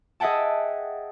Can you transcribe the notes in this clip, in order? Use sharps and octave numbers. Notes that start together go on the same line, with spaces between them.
G#4 D#5 E5 F#5 G5 A5